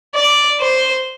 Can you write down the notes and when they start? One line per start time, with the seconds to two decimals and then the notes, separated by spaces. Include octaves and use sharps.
0.15 D5
0.60 C5